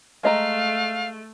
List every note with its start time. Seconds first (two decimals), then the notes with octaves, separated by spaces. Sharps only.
0.23 G#3 A3 D#5 F5 A#5